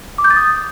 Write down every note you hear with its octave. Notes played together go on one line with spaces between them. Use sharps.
D6
G6
A6
D#6